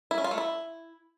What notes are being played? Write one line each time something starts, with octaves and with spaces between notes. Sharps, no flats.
E4
C#4
F4
A3
E4